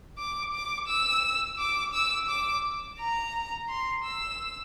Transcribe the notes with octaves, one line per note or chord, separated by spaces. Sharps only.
D6
D6
E6
D6
E6
D6
A#5
C6
E6